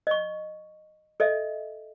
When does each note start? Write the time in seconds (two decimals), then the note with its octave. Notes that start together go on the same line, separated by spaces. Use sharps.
0.07 D#5 C#6
1.20 A4 D#5 E5